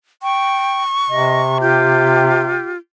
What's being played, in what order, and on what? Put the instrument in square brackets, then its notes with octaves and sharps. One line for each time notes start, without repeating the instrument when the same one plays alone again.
[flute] G5 [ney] C#6
[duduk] C3 [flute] D#5
[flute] F4 [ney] G4